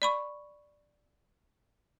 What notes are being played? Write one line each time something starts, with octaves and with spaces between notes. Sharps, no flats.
D5 B5 C#6